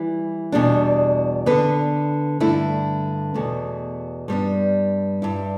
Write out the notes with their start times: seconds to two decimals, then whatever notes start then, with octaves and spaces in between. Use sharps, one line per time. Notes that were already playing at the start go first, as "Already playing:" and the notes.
Already playing: E3 G3 E4
0.52 E2 B2 G3 D4
1.46 D3 B3 D4 B4
2.40 G2 D3 A3 E4
3.34 E2 B2 A3
4.28 G2 G3 B3 D4
5.22 G2 G3 E4